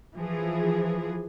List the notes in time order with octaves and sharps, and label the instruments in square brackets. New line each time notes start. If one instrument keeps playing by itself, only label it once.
[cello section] E3 F3 G#4